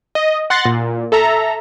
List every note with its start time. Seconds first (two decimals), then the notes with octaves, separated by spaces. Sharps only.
0.15 D#5
0.50 F#5 C6 F#6 A6 A#6
0.65 A#2
1.12 A4 E5 A#5